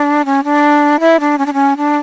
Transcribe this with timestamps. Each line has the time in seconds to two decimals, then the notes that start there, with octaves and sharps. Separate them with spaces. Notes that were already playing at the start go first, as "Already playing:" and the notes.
Already playing: D4
0.25 C#4
0.44 D4
1.00 E4
1.20 D4
1.38 C#4
1.46 D4
1.53 C#4
1.77 D4